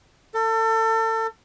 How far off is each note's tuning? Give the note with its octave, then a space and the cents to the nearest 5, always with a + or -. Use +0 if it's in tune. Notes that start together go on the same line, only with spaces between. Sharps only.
A4 +30